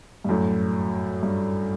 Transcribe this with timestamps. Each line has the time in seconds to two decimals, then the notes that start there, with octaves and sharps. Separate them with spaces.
0.24 G2
0.29 F#2 A2
1.23 G2